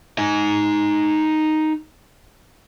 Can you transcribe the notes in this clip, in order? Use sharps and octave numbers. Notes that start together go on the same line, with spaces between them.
D#4 G#5